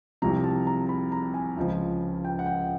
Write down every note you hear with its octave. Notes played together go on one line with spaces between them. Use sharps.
C2 C3 F3 A#5
A5
A#5
B5
A#5
G#5
C#2 C#3 F3
G5
F#5
G5